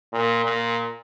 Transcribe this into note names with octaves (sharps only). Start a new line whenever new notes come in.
A#2
A#2